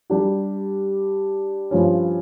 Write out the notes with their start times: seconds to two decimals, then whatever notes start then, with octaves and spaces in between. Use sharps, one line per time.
0.10 G3 D4 G4
1.71 G2 F3 C#4